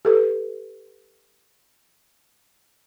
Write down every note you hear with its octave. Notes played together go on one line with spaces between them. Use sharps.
G4 A4 B4